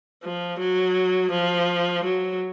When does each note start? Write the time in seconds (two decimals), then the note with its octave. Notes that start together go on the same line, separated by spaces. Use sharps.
0.23 F3
0.58 F#3
1.31 F3
2.03 F#3